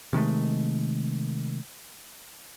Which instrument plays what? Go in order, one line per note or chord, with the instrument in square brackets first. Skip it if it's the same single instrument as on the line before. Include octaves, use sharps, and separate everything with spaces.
[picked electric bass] C3 D#3 G#3 A3